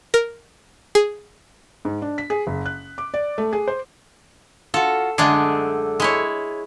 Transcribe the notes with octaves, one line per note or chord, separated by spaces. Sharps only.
A#4
G#4
G#2
D4
B6
G#4
F#1
F#6
D6
D5
A3
G#4
C5
F4 F#4 A4
F#2 D3 G#3 A3 D4 G#4
G#3 E4 C#5